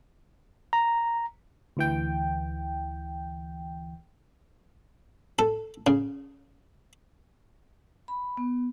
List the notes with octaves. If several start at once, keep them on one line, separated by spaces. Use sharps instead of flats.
A#5
D2 E3 G5
A4
C#3
B5
B3